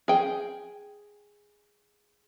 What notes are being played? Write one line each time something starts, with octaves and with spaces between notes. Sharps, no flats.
G#4 G5